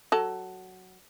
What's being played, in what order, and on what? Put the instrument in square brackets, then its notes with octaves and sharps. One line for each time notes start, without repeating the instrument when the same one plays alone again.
[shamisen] F#3 A4